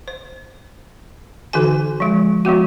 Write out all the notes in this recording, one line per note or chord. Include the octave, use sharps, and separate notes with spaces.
C5
D3 E3 D#4 F#4 B4 G#5
F3 G#3
F3 G#3 B3 F#4